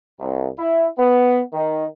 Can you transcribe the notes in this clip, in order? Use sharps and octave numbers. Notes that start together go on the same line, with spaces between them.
C2
E4
B3
D#3